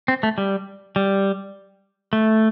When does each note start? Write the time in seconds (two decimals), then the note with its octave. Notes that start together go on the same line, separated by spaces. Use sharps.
0.08 C4
0.23 A3
0.38 G3
0.96 G3
2.13 A3